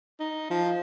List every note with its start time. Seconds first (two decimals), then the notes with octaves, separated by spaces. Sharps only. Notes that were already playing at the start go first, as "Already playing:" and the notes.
0.20 D#4
0.50 F3